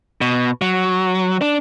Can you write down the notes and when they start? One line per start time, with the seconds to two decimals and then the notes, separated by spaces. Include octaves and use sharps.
0.21 B2
0.62 F#3
1.42 D4